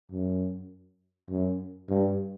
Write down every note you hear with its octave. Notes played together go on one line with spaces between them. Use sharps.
F#2
F#2
G2